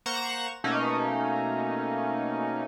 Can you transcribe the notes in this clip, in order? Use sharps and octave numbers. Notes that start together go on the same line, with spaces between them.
A#3 C5 F#5 A#5 C#6 E7
B2 A3 A#3 C#4 D#4